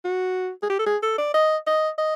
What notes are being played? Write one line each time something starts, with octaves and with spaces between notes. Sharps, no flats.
F#4
G#4
G4
A4
G#4
A4
D5
D#5
D#5
D#5